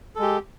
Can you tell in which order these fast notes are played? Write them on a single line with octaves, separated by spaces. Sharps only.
A4 G#3 G4